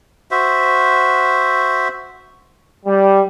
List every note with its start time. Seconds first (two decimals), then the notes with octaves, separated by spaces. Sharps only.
0.31 F#4 C5 E5
2.86 G3